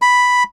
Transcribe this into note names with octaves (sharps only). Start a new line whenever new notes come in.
B5